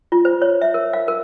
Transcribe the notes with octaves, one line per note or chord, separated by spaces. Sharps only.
F4
C5
C#5
E5
A#4
F5
A#4